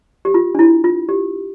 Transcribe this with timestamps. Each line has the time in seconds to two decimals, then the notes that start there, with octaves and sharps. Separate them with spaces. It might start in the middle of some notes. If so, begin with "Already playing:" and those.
0.25 G4
0.34 F4
0.55 D4
0.59 E4
0.84 F4
1.09 G4